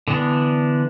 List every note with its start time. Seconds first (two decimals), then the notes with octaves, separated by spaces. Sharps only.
0.08 D3 E3 B3 D4